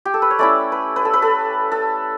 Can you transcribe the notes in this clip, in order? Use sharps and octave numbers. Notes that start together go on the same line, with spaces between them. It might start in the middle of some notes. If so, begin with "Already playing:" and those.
G4
A4
B4
C#5
A3 C#4 E4 D5
B4
B4
A4
B4
A4
A4